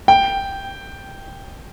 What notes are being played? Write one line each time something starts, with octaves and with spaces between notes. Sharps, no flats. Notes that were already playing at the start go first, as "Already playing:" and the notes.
G5